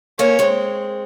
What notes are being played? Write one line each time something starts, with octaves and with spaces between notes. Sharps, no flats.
A#3 C#4 C#5
G#3 C4